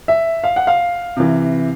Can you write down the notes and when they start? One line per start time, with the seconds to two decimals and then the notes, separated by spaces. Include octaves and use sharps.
0.08 E5
0.44 F5
0.56 F#5
0.67 F5
1.17 C3 E3